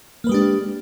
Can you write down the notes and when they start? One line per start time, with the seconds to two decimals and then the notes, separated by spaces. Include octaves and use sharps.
0.24 A#3
0.27 B4
0.29 G#3
0.32 G4
0.34 D4